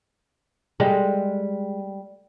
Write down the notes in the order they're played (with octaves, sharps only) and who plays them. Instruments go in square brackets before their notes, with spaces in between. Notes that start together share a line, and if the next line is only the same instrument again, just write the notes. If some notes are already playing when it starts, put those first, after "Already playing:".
[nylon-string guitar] G3 [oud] G#3